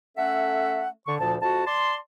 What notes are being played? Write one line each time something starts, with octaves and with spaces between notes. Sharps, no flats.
A3 C#4 A4 E5 F#5
D3 C#6
D2 A#2 F3 A5
F2 F#4 A5
D5 A5 C6